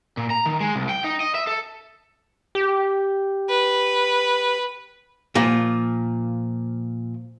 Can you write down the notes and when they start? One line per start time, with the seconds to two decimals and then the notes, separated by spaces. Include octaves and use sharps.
0.17 A#2
0.31 A#5
0.46 D#3
0.60 G#3
0.76 C2
0.89 G5
1.04 D#4
1.20 D#5
1.35 E5
1.47 A4
2.55 G4
3.49 B4
5.35 A#2 F3 A#3